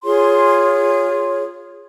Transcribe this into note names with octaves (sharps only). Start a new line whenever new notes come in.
F4 G#4 C#5 C6